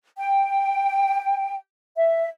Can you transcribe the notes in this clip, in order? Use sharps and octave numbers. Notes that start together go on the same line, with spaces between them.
G5
E5